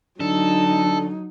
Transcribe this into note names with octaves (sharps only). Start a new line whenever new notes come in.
D3 F#3 D#4 A4